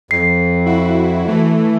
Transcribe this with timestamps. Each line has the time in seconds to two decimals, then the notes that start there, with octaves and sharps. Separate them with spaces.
0.11 F2 C7
0.65 E4 F#4
1.27 E3 A3